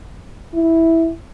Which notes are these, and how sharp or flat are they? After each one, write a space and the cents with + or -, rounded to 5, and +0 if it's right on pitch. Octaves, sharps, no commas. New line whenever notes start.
E4 -5